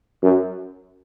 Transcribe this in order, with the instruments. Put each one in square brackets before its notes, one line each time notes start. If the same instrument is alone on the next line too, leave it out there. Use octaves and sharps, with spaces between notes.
[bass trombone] F#2